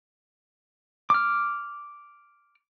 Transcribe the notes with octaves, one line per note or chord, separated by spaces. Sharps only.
D6 F6